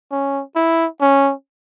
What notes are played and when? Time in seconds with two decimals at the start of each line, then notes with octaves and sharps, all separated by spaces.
0.11 C#4
0.55 E4
1.01 C#4